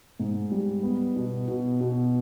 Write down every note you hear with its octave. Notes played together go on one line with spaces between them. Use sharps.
G#2
G3
B3
B2
B2
B2